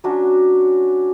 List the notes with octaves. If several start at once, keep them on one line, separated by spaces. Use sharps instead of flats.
F#3 C#4 D4 F#4